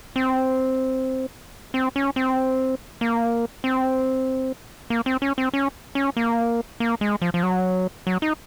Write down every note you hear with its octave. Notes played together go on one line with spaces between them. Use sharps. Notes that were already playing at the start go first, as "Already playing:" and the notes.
C4
C4
C#4
C4
A#3
C4
A#3
C4
C#4
C4
C#4
C#4
A#3
A#3
G#3
F3
F3
F#3
F#3
D#4